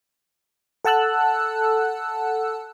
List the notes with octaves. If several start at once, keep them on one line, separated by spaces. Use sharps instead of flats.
A4 F#5 A5 E6 F#6